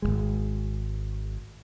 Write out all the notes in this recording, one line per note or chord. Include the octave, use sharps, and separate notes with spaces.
G#1 C#2 G#3